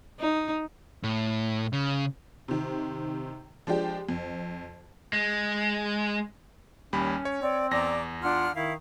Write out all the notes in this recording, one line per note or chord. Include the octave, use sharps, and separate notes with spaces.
D#4
A2
C#3
C3 D#3
F3 G#3 D4 G4
F2
G#3
D#2 G3 C#4 B5
C#5
C4 D5
E2 D5 A#5 D6 A#6
D4 F4 F#5 F6
D#3 E4 F5